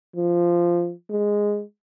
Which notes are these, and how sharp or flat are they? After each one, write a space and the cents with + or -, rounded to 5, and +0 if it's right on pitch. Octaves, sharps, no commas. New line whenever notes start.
F3 -10
G#3 -5